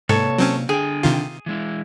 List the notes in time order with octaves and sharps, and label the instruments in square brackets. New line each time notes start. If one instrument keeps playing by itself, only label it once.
[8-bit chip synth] G#2 [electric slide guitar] C3 A#3 [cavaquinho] A4 C#5
[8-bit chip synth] F#3 C4 C#4
[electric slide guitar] D3 G5 [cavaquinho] G#4
[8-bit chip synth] C3 D#3 F4
[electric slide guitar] E3 G#3 E4